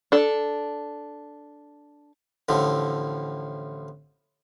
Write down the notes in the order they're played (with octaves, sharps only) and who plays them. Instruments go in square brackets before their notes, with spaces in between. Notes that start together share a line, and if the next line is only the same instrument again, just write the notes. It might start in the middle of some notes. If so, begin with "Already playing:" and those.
[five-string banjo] D4 A4
[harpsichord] A1 A2 D3 F3